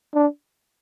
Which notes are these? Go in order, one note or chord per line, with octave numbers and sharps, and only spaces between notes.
D4